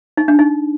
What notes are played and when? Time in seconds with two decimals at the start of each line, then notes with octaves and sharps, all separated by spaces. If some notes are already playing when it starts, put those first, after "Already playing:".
0.17 D#4
0.28 D4
0.39 D#4